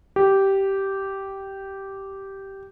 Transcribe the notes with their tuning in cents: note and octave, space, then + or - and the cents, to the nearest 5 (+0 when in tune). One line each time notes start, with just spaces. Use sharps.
G4 -10